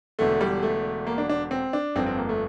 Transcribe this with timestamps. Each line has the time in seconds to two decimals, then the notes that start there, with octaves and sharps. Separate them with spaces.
0.19 E1 E2 D3 A3
0.41 G3
0.62 A3
1.07 A#3
1.18 D4
1.29 D4
1.51 C4
1.73 D4
1.96 G1 F2 D3 F3 C4
2.06 C4
2.18 A#3
2.29 A3